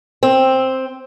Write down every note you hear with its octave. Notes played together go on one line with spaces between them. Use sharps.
C4